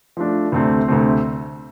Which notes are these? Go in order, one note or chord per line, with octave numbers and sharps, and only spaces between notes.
F3 A3 D4
D2 C3 A3 C4
D2 C3 A3 C4